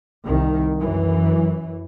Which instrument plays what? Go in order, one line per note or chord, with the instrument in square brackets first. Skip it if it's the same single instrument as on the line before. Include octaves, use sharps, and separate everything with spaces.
[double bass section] C2 D#3
F#2 E3